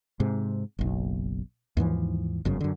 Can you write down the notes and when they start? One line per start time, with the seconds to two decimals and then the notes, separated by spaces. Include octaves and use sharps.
0.20 G#2 C3
0.79 F#1 B1
1.77 D#2 G#2 E3 F3
2.45 G1 F#2 C#3
2.61 F#2 D3